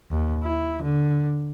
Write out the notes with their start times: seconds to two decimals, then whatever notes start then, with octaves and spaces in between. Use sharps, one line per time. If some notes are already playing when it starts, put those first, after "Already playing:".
0.11 D#2
0.43 E4
0.82 D3